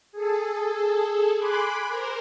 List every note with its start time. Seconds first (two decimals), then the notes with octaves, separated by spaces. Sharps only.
0.12 G#4 A4
1.38 G#5 B5 C6 D6 F#6
1.87 A#4 C5